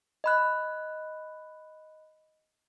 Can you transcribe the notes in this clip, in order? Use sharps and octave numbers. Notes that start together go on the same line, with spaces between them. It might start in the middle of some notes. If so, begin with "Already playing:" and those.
D#5 B5 F#6